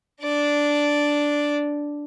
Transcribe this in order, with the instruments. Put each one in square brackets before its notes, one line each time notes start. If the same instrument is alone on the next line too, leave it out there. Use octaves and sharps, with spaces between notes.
[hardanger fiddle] D4 D5